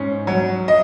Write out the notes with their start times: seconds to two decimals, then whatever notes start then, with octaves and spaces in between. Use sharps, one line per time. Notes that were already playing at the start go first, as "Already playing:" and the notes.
Already playing: G#2 C#4
0.27 F#3
0.68 D#5